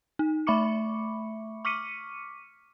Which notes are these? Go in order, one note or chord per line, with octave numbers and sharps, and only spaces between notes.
D#4
A3 E5 B5 C#6 D6 C#7
C#6 D6 F6 B6 C#7 D#7